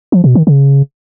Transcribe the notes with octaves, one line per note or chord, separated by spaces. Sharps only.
F3
B2
D#3
C#3